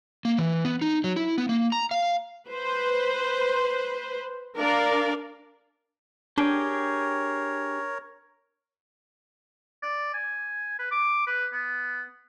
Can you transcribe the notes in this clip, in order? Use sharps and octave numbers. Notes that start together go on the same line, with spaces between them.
A#3
E3
B3
D#4
F#3
E4
B3
A#3
A#5
F5
B4 C5
D4 A#4 D5 F5
D4 G4 G#4 A#4 C#5 G5
D5
G#5
B4
D6
B4
B3